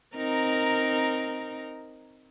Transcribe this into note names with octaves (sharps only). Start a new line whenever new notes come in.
C4 D#4 A#4